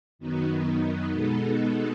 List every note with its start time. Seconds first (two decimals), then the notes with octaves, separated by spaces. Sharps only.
0.19 F#2 D#3 F#3 B3 D#4
1.11 B2 G#3 B3 D#4 A4